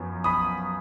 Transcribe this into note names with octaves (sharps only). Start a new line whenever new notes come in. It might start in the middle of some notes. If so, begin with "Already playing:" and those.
Already playing: F#2 F3 B3
B5 D#6